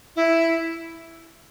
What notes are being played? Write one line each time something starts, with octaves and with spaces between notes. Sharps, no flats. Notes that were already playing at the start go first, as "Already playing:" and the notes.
E4